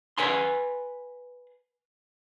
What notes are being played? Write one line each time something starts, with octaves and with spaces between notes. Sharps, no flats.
B4 F#5 G#5 C6